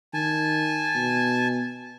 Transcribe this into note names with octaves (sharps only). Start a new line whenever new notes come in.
D#3 G#5 A5
B2